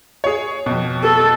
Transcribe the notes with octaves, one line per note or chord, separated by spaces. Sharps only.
G#4 C#5
F2 B2
A4